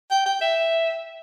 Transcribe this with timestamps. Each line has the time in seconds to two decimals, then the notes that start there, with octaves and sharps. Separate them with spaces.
0.11 G5
0.26 G5
0.41 E5